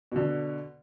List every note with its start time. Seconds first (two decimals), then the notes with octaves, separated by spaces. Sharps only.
0.12 B2 D3